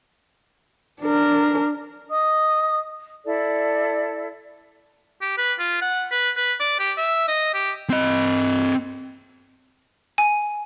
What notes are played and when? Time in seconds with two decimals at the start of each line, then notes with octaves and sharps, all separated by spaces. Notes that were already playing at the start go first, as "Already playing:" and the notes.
1.01 D4 A#4
2.10 D#5 D#6
3.26 E4 A4 D5
5.21 G4
5.38 B4
5.59 F4
5.82 F#5
6.11 B4
6.37 B4
6.60 D5
6.79 G4
6.97 E5
7.28 D#5
7.54 G4
7.90 C4 D#5
10.18 G#5